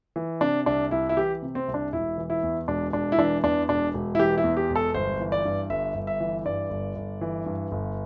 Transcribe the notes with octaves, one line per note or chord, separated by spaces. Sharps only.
E3
C3 D4
C2 D4
C2 E4
E4
E3 G4
C3
C4
C2
D4
E1 E4
E3
E4
E2
E1 D4
E1 D4
E4
E3 D4
E2 D4
E1 D4
E1
E4
E3 G4
E4
E2
G4
E1
A4
G1 C5
E3
D5
G2
G1 E5
G1
E5
E3
G2 D5
G1
G1
E3
G2
G1